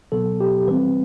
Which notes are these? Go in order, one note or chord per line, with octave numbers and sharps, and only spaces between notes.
B2 F#3 B3 A4
G4
E3 G3 C4 B4